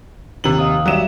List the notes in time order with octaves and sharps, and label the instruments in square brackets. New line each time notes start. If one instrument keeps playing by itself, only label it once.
[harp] D#2 A6 [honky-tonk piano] C3 F#7
[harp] D#5 F5 D#6
[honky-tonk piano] F#3 E7 [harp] G3 E5